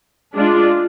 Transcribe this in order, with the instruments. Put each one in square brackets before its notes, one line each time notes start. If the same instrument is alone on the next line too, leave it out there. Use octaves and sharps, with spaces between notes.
[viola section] G#3 D4 F4